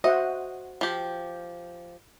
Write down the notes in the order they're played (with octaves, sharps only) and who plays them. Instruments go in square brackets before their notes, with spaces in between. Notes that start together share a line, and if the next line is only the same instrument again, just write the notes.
[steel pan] F#4 C5 F#5 [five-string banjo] D#5 [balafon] E5
[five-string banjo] F3 G4